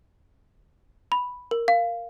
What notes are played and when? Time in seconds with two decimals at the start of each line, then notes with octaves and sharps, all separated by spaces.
1.12 B5
1.51 A#4
1.68 F5